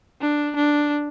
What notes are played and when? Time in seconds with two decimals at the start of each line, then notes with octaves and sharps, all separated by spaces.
0.21 D4
0.56 D4